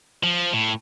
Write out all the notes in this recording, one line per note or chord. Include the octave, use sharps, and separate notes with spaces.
F3
A2